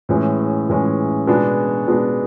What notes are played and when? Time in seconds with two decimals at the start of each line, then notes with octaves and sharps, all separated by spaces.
0.09 A2 E3 G#3 C#4
0.69 A2 E3 G#3 C#4
1.27 B2 G#3 B3 D4
1.87 B2 G#3 B3 D4